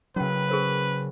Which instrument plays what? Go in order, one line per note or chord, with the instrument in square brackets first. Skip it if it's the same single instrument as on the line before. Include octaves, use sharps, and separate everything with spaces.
[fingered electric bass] C#3 F#3 [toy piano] C#4 F#4 G5 [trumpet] B4
[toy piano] G#4 A#4 C5